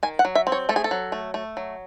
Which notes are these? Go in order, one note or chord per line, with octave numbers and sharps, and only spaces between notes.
D#3 G#5
F#5
F#3
E5
C4
C#5
A3 A4
G#4
A4
F#3
A3
A3
F#3